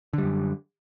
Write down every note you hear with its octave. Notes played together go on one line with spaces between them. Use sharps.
F#2 D3 G3